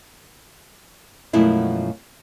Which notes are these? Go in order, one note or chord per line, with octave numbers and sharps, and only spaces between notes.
F#2 B2 F3 G#3 A3 E4